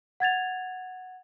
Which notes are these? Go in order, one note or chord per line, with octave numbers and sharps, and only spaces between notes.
F#5 G#6 A6 F7